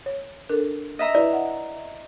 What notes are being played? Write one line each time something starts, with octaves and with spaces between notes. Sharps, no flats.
C#5
D4 A4 A#4
D#5 E5 A#5
E4 B4 D5
F#5